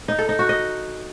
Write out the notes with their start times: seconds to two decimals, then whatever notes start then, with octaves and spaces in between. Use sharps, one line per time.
0.08 D#4
0.19 A4
0.29 D#4
0.39 F#4
0.49 D#5